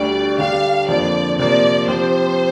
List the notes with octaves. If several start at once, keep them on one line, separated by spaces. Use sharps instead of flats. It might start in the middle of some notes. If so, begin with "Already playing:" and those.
Already playing: D2 D3 G3 D5
D3 G3 D4 F5
F2 D3 F3 A#3 D5
C3 F3 A#3 D5
F3 C4 G4 C5